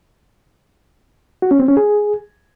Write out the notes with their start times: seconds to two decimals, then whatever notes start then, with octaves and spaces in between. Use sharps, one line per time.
1.42 F#4
1.51 C#4
1.60 C4
1.68 C#4
1.77 G#4